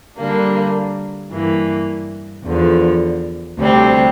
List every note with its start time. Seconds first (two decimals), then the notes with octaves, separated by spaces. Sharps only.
0.18 D3 G3 A#3 D4
1.31 G2 E3 A#3
2.45 E2 D3 F3
3.59 D2 C3 G3 C4